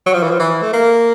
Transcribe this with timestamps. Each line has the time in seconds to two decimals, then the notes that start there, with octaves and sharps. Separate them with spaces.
0.06 F#3
0.13 F3
0.23 E3
0.30 F3
0.39 E3
0.62 A3
0.73 A#3